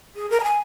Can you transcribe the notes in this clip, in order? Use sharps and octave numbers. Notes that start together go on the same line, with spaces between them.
G#4
A#4
A#5
G#5